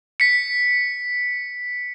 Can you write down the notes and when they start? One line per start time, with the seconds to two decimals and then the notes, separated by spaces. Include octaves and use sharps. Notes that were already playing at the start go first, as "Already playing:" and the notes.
0.20 B6 C#7